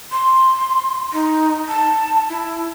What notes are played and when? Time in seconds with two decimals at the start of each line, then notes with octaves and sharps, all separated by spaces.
0.12 C6
1.13 D#4
1.68 A5
2.29 E4